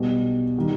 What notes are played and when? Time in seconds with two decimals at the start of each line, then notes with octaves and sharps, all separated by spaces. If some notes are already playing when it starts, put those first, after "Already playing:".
Already playing: B1 B2 G3
0.58 D#3 G3